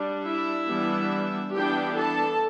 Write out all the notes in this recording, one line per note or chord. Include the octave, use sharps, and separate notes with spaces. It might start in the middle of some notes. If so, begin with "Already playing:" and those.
Already playing: G3 D4
E4 E5
E3 G3 B3 D4
E3 B3 D4 G4 G5
A4 A5